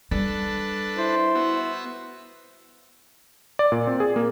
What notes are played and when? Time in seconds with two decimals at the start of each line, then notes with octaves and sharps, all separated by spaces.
0.11 G3 D4 A4 B4
0.97 E4 C5
1.35 B3 F#4 E5
3.59 D5
3.72 A#2
3.87 C4
4.00 G#4
4.16 A#3